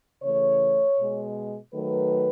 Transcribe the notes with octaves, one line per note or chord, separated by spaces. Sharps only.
C#3 E3 A3 C#5
B2 G#3
D#3 F#3 A3 B4